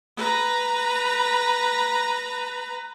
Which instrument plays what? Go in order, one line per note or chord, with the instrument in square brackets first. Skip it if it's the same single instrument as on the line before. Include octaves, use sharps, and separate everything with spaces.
[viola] B4 A#5